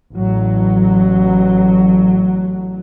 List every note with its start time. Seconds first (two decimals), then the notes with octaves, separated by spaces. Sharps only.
0.12 A1 F#3